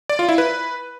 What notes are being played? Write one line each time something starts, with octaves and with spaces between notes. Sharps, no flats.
D5
F4
E4
B4